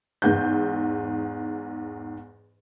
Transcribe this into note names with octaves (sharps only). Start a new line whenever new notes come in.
E2 G#2 G6